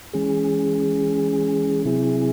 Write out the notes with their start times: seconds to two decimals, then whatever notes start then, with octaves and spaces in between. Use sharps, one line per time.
0.13 E3 G#3 C#4 G#4
1.85 C3 F#3 C4 E4 G#4